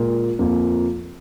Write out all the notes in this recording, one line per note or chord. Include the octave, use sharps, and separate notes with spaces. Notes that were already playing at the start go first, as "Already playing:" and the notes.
Already playing: A#2 G#3 F4 A#4
F2 F3 A#3 F4